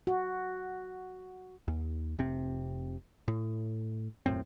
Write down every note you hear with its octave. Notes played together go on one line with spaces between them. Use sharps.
F#4
D#2
F1 C3 C4
A2
D#1 F#2 A2 C4